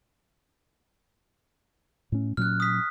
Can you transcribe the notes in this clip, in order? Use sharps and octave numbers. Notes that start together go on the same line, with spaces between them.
A2 A3 C#4
A#2 F#3 C#4 F6 F#6
D#6 B6